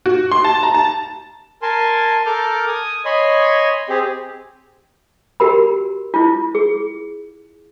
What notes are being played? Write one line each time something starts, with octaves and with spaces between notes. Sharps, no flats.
F#4
C6
A5
A#5
A5
A#4 G#5 A5 C6
A4 A#4 D6 F6 G6
G#5 D#6
C#5 D#5 G#5 B5 C6
C4 G4 G#4
F#4 G4 A#4 B5
E4 F4
G#4